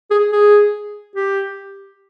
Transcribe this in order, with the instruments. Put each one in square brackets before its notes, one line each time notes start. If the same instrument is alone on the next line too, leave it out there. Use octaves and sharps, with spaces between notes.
[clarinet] G#4
G#4
G4